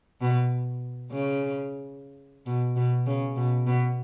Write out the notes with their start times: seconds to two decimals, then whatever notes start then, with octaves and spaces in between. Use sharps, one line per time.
0.21 B2
1.11 C#3
2.46 B2
2.76 B2
3.06 C#3
3.36 B2
3.67 B2